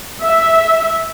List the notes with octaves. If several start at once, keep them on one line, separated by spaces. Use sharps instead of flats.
E5